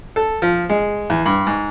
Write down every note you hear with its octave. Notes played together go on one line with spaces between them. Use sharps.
A4
F3
G#3
E2
G2
G#2